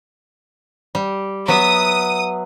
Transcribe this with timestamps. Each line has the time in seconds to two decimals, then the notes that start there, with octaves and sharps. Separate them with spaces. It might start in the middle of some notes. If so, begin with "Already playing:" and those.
0.95 G3
1.48 F#3 B3 E5 D#6